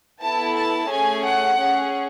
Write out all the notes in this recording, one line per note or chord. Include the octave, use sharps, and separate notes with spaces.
B3 E4 A4 A5
A5
A3 C#4 G#4 G#5
F#5
C#4 G#4